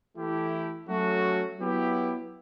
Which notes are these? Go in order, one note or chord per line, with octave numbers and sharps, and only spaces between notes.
E3 A3 E4 G4
F#3 A3 C#4 F#4
F#3 B3 E4 G4